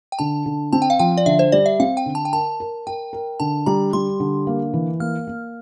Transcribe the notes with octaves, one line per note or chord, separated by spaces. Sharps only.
G5
D3 A5
D3
C4 A5
G5
F5
F3 G5
D5
D3 E5
C5
G3 D5
E5
C4 F5
G5
D3
A5
G5
A#4 A5
A#4
A#4 G5
A#4
D3 A5
G3 A#5
G3 C6
D3
A#3
E3
A#3 F6
A#3